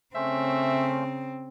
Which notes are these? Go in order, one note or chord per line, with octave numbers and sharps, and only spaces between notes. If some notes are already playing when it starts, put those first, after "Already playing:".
C#3 A3 C4 C#4 C5 E5